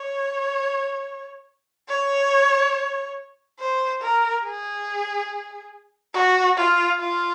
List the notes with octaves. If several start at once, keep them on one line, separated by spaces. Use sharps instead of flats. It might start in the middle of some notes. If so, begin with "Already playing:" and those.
Already playing: C#5
C#5
C5
A#4
G#4
F#4
F4
F4